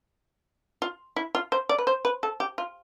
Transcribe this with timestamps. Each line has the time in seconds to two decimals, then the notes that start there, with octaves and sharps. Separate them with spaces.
0.82 F4
1.16 E4
1.35 F4
1.52 C5
1.69 D5
1.78 B4
1.87 C5
2.05 B4
2.23 A4
2.40 G4
2.58 F4